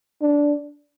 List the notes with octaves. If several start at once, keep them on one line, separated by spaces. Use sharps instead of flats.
D4